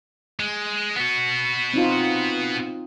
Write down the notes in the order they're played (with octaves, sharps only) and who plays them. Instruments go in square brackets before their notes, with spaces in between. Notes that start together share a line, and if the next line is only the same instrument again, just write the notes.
[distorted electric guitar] G#3
B3 F#4
[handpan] C4 D#4 F4